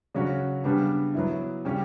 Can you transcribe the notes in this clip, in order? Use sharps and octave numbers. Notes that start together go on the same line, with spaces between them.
C#3 F#3 C#4 F#4
C#3 G3 B3 D4
F#3 B3 E4
C#3 G3 C#4 G4